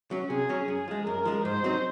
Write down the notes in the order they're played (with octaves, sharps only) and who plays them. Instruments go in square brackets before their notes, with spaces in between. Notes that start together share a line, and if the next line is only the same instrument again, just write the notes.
[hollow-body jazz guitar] F#3 C#4
[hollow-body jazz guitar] C3 [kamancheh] G#4
[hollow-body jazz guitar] F#3 C#4
[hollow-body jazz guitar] F#2 [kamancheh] G#4
[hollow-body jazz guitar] F3 G#3
[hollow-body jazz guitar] F#2 [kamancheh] A#4
[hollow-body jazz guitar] F3 G#3
[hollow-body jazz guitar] G#2 [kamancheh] C5
[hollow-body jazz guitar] F#3 C4 D#4